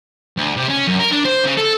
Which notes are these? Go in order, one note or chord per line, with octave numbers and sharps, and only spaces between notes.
D2
C3
C#4
F#2
A#4
D4
C5
C#3
A4